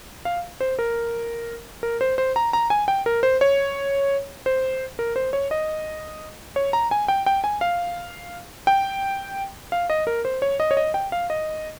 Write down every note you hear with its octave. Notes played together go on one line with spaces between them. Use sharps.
F5
C5
A#4
A#4
C5
C5
A#5
A#5
G#5
G5
A#4
C5
C#5
C5
A#4
C5
C#5
D#5
C#5
A#5
G#5
G5
G5
G#5
F5
G5
F5
D#5
A#4
C5
C#5
D#5
C#5
D#5
G5
F5
D#5